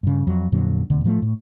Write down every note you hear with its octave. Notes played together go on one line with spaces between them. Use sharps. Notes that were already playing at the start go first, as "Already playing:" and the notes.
G2 C#3
F2 F#3
F2 A#2 D3 F#3
E1 D2 D3
A2 F3 G3 A3
A2